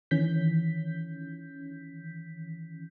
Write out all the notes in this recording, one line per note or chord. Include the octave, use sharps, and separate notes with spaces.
D#3 E3 C#4 G6 B6